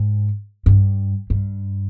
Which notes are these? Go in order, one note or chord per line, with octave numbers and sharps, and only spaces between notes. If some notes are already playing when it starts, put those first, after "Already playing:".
Already playing: G#2
G2
G2